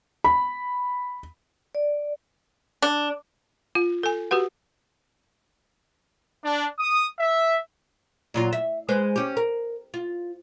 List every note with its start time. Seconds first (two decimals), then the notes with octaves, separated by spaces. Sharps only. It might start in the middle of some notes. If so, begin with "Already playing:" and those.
0.24 B5
1.75 D5
2.82 D4
3.75 F4
4.03 A4 G#5
4.31 F#4 G4 B4 F#5
6.44 D4
6.79 D#6
7.19 E5
8.34 A#2 F#3 F4
8.53 E5
8.89 G#3 B4 C5
9.16 C#4 G4
9.37 A#4
9.94 F4